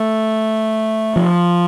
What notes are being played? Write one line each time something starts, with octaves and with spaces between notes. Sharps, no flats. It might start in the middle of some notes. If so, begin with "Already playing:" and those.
Already playing: A3
F3